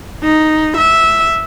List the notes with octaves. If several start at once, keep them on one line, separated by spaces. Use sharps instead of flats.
D#4
E5